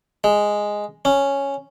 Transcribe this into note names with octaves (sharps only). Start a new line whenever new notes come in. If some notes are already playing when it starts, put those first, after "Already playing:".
G#3
C#4